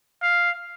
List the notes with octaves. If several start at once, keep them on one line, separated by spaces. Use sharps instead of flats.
F5